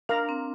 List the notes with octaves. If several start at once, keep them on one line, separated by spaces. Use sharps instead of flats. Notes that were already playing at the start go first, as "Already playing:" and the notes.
D4 A#4 F5 A#5
C4